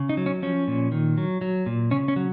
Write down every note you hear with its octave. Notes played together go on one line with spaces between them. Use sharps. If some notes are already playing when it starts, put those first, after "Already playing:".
Already playing: C#3
D#4
F#3
C#4
F3 C#4
A#2
D#3
F#3
F#3
A#2
C#3 C#4
C#4
F#3